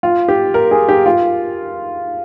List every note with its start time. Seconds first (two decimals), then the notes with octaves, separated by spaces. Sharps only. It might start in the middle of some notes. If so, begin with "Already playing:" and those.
0.03 F4
0.28 G4
0.54 A#4
0.71 G#4
0.89 G4
1.06 F4